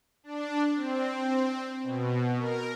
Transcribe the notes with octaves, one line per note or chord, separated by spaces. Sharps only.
D4
C4
B2
A#4